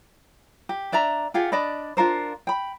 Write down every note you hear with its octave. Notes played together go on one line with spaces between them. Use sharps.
G4
D4 D5 E5 A#5
F4 G4 G#4 F#5
D4 D5 D#5 B5
D4 F4 A#4 C5
G5 B5